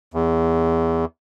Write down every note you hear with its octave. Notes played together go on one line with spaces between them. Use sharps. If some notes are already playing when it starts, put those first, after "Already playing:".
E2